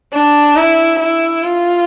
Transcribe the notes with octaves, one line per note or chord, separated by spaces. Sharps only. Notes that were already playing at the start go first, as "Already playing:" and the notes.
D4
E4
E4
F4